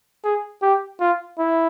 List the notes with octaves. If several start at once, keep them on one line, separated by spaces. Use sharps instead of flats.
G#4
G4
F4
E4